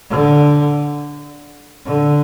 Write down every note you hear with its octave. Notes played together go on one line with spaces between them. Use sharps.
D3
D3